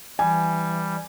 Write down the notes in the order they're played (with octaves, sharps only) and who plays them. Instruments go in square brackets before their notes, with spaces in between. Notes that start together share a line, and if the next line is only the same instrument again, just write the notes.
[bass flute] E3 [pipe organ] G3 [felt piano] G#5